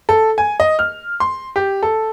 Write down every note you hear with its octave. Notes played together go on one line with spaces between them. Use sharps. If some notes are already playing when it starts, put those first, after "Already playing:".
A4
G#5
D#5
F6
C6
G4
A4